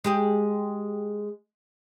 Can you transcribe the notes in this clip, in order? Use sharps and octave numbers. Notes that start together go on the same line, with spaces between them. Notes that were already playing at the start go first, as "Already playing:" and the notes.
G#3 G4 G#4